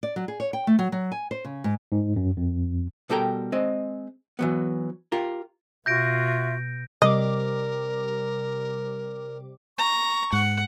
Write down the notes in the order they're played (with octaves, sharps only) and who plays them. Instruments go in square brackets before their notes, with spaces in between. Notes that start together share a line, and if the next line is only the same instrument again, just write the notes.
[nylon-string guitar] D5
F#3
G#4
C#5
G5
A3
F#3
F#3
G#5
C5
C#3
G#2
[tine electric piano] G#2
F#2
F2
[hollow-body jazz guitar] B2 G3 A4 A#4 G5 A#5
G#3 C4 D#5
E3 F#3 B3
F4 G4 A#4
[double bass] B2 [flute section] F4 F#4 E5 [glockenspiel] G6 A#6 D7
[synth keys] C3 G3 D6 [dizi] A#4 [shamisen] D#5
[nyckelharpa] A#5 [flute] C#6
[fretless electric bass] G#2 [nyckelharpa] F#5